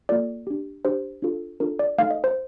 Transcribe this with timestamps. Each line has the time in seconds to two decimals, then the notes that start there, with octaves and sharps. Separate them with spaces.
0.09 A#3 F4 A4 D5
0.47 D4 G4
0.85 D4 G4 C5
1.22 D4 F4 A4
1.60 D4 F4 A4 A#4
1.79 D5
1.98 A3 D#4 A4 F5
2.11 D#5
2.24 C5